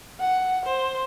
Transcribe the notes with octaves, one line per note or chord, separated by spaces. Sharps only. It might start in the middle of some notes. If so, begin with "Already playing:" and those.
F#5
C5